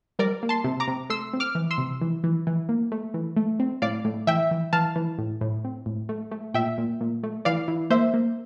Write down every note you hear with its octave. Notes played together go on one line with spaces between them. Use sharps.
G3 A#4 D5
A#3
A5 C6
C3
A#5 D6
C3
A3 C6 E6
C4
D6 F6
E3
C6 E6
C3
E3
E3
E3
A#3
A3
E3
A3
C4
A2 D5 F5
A2
E3 E5 G5
E3
E3 F5 A5
E3
A2
A2
C4
A2
A3
A3
A#2 E5 G5
A#2
A#2
A3
E3 D5 F5
E3
A#3 C5 E5
A#3